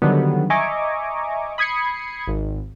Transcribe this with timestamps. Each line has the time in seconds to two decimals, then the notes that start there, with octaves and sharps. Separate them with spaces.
0.02 D3 D#3 F#3 G3 B3
0.50 D#5 E5 G#5 A#5 C#6 D6
1.58 B5 D#6 G#6 C7 C#7
2.28 G#1